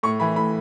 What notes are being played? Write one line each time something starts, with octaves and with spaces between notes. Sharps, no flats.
A2 C#6
E3 B5
A2 B5